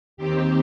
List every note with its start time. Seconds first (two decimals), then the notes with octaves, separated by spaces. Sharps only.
0.17 D#2 D#3 C4 G4